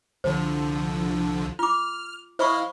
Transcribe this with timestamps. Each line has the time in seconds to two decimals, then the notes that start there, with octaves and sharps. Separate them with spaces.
0.24 C2 D3 F3 C5
1.59 F4 D6 F6
2.39 E4 C5 D#5 F5 B5 C#6